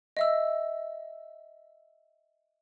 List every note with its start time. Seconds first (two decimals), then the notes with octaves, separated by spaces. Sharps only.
0.17 D#5 E5 E6